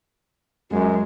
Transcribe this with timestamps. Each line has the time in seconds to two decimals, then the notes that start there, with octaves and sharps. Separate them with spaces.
0.71 F#2 G#3